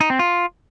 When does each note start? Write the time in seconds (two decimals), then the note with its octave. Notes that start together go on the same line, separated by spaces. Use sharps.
0.01 D#4
0.10 C4
0.19 F4